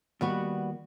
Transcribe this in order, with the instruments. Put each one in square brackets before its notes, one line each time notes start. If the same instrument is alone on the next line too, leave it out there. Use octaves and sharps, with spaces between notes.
[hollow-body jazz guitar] D#2 [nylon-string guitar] G3 B3 F#4